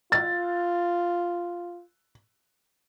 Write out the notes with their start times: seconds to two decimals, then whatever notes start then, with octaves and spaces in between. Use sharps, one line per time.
0.12 F4 A6